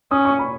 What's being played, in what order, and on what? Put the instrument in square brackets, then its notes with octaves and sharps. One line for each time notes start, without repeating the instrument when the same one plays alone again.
[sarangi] C#4 [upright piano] D#6
[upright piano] C#6
B5